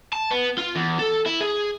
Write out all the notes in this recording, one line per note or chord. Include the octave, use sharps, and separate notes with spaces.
A5
B3
F4
E2
A4
E4
G#4